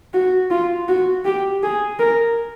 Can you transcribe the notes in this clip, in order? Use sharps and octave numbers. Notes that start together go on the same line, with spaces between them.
F#4
F4
F#4
G4
G#4
A#4